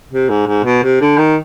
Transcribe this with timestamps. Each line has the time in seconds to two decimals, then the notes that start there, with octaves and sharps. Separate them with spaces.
0.11 C3
0.29 G#2
0.47 G#2
0.64 B2
0.83 C3
1.01 D3
1.18 D#3